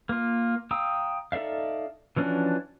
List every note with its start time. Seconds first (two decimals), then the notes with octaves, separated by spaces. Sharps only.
0.09 A#3 F4
0.71 F5 G5 A#5 D#6 E6
1.32 D#4 A4 D5 E5 F5
2.16 E3 F3 C#4 D4 F#4